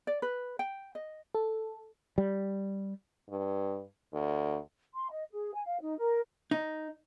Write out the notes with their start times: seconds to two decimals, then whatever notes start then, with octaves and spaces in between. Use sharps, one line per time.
0.07 D5
0.22 B4
0.59 G5
0.95 D#5
1.35 A4
2.18 G3
3.30 G2
4.13 D2
4.95 C6
5.11 D#5
5.31 G#4
5.54 G#5
5.66 F5
5.81 D#4
5.99 A#4
6.51 D#4